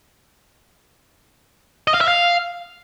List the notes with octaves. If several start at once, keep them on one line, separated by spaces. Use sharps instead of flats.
D#5
F5
E5
F5